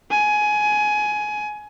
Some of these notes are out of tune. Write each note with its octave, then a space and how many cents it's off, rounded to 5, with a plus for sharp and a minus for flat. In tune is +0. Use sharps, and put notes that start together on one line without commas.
G#5 +20